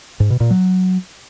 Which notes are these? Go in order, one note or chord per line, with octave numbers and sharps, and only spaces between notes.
G#2
B2
A#2
F#3